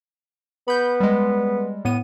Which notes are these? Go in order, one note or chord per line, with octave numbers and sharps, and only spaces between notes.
B3 B5 G6
G3 G#3
A2 B3 D#7